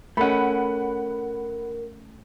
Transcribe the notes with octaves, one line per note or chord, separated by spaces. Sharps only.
A3 C#4 A#4 F#5 B5